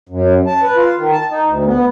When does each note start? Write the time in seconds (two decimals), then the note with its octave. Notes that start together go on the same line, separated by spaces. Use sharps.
0.09 F#2
0.47 A5
0.63 B4
0.76 F4
0.98 D#3
1.12 A5
1.31 D#4
1.47 D2
1.66 B3